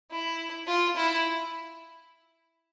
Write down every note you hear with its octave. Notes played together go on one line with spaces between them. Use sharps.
E4
F4
E4